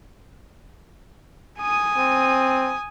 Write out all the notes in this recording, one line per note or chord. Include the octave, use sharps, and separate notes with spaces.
G#5 D#6
C4